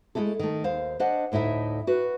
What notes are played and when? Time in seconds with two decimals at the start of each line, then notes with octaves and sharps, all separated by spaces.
0.15 G#3 A3 D#4 E4 A4
0.39 D#3 A3
0.64 D#2 C5 F5
1.00 D4 C5 D#5 F#5
1.32 D2 A2 D#4 E4 E5
1.87 F#4 B4